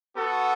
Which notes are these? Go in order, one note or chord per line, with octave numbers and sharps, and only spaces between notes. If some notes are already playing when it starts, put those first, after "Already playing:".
B3 F#4 A4